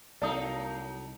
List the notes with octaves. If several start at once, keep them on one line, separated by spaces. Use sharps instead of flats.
C2 F#3 A#3 D#4 A4 D5 D#6